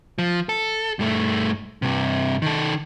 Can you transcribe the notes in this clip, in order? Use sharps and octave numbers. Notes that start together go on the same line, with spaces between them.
F3
A4
G2 A3
G2 C3
D#3 A4